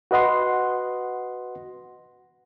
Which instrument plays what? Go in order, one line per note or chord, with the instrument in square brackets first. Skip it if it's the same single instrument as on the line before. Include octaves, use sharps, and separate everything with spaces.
[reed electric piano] F#4 B4 D#5 F#5 C6